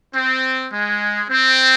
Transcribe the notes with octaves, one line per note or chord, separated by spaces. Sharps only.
C4
G#3
C4